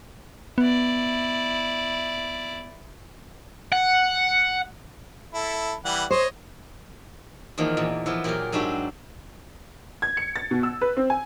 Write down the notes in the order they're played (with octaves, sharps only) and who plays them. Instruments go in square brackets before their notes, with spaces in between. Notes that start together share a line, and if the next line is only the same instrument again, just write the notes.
[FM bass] B3 [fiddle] E4 D5
[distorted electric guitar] F#5
[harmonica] E4 A4
E3 G3 F#5
[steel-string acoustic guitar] C5 [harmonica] C#5 D#5
[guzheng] E2 D#3 F3 A#3
E2 A#2
E3 F3 B3
A#2 F#3 G4 G#4 A#4
G#2 F#3 D4 F#4 G4 E5
[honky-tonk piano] G#6
C#7
A6
B2
E6
B4
C4
G#5